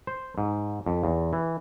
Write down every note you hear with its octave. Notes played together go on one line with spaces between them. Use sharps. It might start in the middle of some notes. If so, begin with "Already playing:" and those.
C5
G#2
F2
E2
E3